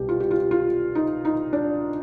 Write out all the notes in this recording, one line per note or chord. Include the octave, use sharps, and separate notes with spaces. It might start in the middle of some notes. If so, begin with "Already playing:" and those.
Already playing: C2 B2 G4
F4
G4
F4
F4
D#4
D#4
D4